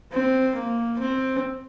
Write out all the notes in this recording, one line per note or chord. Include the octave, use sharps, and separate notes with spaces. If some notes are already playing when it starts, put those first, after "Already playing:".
C4
A#3
C4